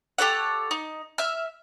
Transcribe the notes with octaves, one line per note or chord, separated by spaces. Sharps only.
G4 A4 C#5 F#5
D#4
E5 F6